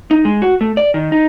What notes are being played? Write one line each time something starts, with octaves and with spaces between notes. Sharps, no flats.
D#4
G#3
F#4
A3
D5
D#3
D#4